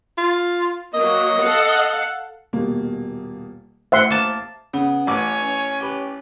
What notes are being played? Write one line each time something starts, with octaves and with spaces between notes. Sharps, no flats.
F4
F#3 A#3 D#5
A4 F5 F#5
D#1 B2 A#3
A1 C5 E5 F#5 C6
A#3 A5
C#3 B3
A1 C#5 G#5 D6
C#4
G4 B4